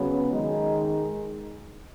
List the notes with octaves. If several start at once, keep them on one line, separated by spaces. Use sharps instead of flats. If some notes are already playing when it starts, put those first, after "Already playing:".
Already playing: C#3 F#3 B3
D#3 G#3 D#4